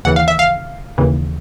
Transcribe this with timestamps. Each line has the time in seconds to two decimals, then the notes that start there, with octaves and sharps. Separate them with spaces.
0.05 D#2 C#3 E3 F#5
0.16 F5
0.28 E5
0.39 F5
0.98 D#2 C#3 E3